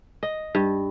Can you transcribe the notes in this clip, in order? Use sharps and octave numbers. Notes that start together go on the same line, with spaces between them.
D#5
G2